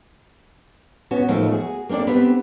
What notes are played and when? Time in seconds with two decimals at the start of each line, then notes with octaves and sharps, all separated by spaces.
1.11 B3 C#4 F#4
1.28 D#2 A2 D#3 F3 A3
1.51 F#4 G#4
1.89 A#3 C4 D4 A4 D5
2.07 B3 C4 D4 G4 B4